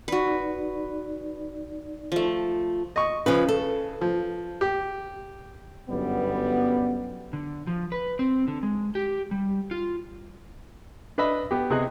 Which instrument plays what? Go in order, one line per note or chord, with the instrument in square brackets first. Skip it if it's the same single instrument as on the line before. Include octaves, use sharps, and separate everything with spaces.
[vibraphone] D#4 D5 [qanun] F#4 B4
[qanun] F3 A3
[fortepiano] D#5 C#6
[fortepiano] C#3 [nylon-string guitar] F3 G#4 B4
[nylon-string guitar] A4
[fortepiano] F3
G4
[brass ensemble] G1 F#2 G3 B3
[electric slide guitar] D3
F3
B4
C4
D3
G#3
G4
G3
F4
[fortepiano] D4 B4 D#5 E5 B5
B3 G4
C3 B3 G#4 D#5 F#6